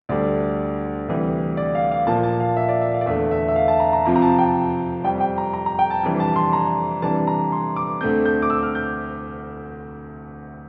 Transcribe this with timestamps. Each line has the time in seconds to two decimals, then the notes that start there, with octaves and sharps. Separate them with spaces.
0.09 D2 D3 G3 D4 D5
1.08 D2 C3 E3 G3
1.57 D5
1.75 F5
1.91 F5
2.07 A#2 F3 A#3 A5
2.23 A5
2.40 F5
2.57 E5
2.69 D5
2.81 E5
2.94 F5
3.01 D5
3.06 E2 D3 A3 E5
3.31 E5
3.48 E5
3.56 F5
3.68 A5
3.80 A#5
3.93 A#5
4.05 F2 C3 F3 C4 F4 A#5
4.16 A#5
4.22 A5
4.38 G5
5.04 F2 C3 G3 C4 G5
5.21 G5
5.38 A#5
5.54 A#5
5.66 A#5
5.79 G5
5.90 A5
6.03 F2 C3 E3 G3 D4
6.20 A5
6.36 C6
6.53 A#5
7.02 C3 E3 G3 D4 A5
7.27 A#5
7.52 C6
7.76 D6
8.01 D2 D3 A3 C4 G6
8.26 G6
8.42 D6
8.50 E6
8.63 F6
8.75 G6